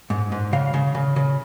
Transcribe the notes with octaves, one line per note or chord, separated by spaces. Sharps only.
G#2
G#2
C#3 F5
C#3
C#3
C#3